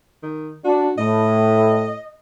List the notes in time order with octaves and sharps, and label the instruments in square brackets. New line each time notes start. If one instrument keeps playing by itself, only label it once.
[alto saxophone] D#3
[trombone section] D4 [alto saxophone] F#4
[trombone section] A2 [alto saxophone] D#5